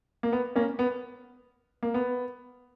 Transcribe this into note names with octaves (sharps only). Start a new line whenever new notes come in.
A#3
B3
A#3 C#4
B3
A#3
B3